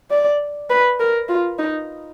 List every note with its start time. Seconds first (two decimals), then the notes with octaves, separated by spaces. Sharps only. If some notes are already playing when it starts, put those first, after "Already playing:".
0.10 D5
0.70 B4
0.99 A#4
1.29 F4
1.59 D#4